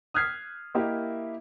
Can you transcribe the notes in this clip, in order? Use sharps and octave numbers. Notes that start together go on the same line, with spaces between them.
D#6 F6 F#6 G#6 B6 C7
A#3 E4 G4 A#4 D#5 E5